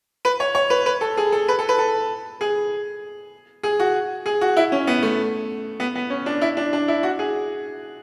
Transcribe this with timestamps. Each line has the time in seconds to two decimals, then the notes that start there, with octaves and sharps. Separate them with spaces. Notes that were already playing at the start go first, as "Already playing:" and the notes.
0.25 B4
0.40 C#5
0.55 C#5
0.70 B4
0.86 B4
1.01 A4
1.17 G#4
1.32 A4
1.48 B4
1.59 A4
1.69 B4
1.78 A4
2.41 G#4
3.63 G#4
3.80 F#4
4.26 G#4
4.41 F#4
4.57 E4
4.72 C#4
4.87 B3
5.02 A3
5.80 B3
5.95 B3
6.10 C#4
6.26 D4
6.41 E4
6.57 D4
6.73 D4
6.88 E4
7.03 F#4
7.19 G#4